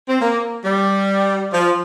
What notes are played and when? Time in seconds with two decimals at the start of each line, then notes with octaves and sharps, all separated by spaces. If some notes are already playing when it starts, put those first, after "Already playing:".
0.09 C4
0.21 A#3
0.65 G3
1.53 F3